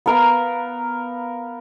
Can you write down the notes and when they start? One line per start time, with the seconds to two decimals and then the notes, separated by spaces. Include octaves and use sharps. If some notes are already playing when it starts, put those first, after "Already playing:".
0.06 B3 A#4 F5